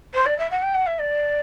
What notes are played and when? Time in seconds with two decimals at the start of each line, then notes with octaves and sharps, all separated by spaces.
0.14 C5
0.26 D5
0.38 E5
0.51 F#5
0.63 G5
0.75 F#5
0.86 E5
0.99 D5